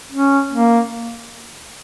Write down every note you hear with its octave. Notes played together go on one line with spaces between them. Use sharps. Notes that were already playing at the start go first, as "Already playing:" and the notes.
C#4
A#3